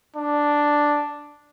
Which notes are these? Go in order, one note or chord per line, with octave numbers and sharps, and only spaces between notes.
D4